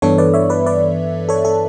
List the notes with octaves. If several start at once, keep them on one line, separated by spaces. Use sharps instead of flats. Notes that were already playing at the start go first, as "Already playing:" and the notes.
G2 E3 B3 D4 A4 C#5
B4 D5
C#5 E5
B4 D5
B4 D5
A4 C#5
A4 C#5